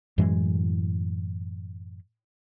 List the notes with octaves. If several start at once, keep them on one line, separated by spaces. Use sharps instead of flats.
F#2 A2 E3 G#3